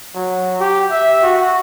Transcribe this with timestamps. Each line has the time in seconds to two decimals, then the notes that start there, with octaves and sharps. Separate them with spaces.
0.14 F#3
0.60 G4
0.91 E5
1.23 F#4